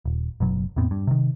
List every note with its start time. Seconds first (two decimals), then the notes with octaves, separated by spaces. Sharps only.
0.05 D#1
0.40 F#1 B2 F#3
0.76 E2 A2 B3 C4
0.91 G2
1.07 C3 D#3